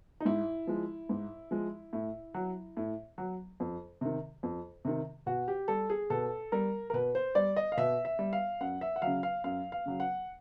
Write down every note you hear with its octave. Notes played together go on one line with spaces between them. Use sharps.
D#4
G#2 E4
F3 G#3
G#2
F3 G#3
A2
F#3
A2
F#3
F2
C3 D#3
F2
C3 D#3
B2 F#4
G4
G3 A4
G#4
B2 A4
G3 A#4
A#4
B2 B4
C5
G3 D5
D#5
F5
B2 E5
E5
G3
F5
F#2 F#5
E5
F#5
C#3 F#3 F5
F5
F#2 F5
F5
C#3 F#3
F#5